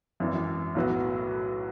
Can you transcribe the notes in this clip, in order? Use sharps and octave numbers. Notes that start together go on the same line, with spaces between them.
G#1 F#2 E3
B1 A2 F#3 B3 F#4